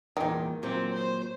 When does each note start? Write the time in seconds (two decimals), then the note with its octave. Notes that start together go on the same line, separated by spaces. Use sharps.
0.17 E2 A#2 D#3
0.63 A#2 F#3 C4 G4
0.93 C5